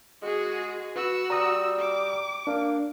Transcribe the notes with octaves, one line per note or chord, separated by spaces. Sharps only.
G#3 F#4 G#4
F#4 B4 E6
G3 A#5 D#6
D6
A#3 D4